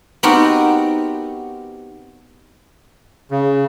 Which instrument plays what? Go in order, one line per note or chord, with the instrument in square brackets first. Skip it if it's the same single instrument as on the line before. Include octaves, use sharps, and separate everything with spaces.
[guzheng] B3 C4 D#4 F#4 G4 A#4
[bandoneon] C#3